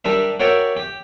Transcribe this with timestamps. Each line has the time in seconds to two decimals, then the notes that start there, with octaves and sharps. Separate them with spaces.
0.05 G3 D4 A#4 E5
0.40 F#4 A#4 C#5 D5 E5 G5
0.77 G4